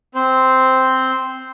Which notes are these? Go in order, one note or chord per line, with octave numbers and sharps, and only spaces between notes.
C4 C5